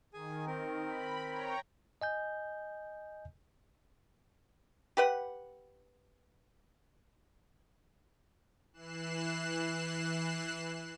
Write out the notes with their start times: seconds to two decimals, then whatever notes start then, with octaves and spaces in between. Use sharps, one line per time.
0.14 D#3 G#4 G#5
0.47 C4 A#4
0.87 B5
1.29 C#5 G5 A#5
2.01 D#5 G#5 G6
4.97 G4 B4 F#5
8.73 E3 F#6 C7 E7